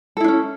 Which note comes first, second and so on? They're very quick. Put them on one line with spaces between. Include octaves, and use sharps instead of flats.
A4 E4 D4 C#4